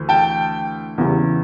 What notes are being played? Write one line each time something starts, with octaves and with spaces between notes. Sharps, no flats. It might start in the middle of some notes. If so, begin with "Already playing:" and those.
Already playing: D2 E3
G5 A5
E2 C#3 E3 G3